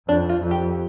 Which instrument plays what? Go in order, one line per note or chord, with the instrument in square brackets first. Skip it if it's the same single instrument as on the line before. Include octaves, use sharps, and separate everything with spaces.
[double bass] F2 [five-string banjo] D4
[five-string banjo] F4
[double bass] F2
[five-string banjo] G4